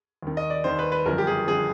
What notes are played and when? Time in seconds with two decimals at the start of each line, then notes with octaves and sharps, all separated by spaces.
0.23 D#2 D#3
0.37 D#5
0.50 D5
0.64 D#2 D#3 C5
0.79 B4
0.92 B4
1.05 G1 F#2 D3 F3 A#4
1.18 G4
1.27 G#4
1.47 D3 F3 G#4